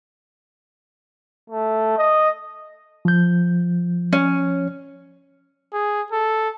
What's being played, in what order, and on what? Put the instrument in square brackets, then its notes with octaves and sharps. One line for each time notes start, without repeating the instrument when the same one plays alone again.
[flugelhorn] A3
D#5
[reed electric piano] F3 G6
[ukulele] C#4
[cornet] G#4
A4